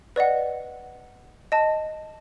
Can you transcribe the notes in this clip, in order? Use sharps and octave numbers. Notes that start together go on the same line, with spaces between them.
B4 D5 D#5 F#5
D#5 A5